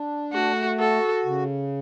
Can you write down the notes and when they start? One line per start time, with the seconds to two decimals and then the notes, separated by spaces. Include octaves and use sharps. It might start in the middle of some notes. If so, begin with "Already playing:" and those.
Already playing: D4
0.33 A3 F#4
0.79 F#4 A4
1.26 C#3